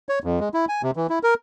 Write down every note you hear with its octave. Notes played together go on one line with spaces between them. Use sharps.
C#5
F2
G#3
E4
G#5
C3
E3
E4
A#4